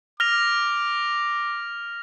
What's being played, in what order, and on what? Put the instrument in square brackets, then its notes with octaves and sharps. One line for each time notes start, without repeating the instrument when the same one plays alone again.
[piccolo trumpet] D6 [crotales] F6 A#6 F7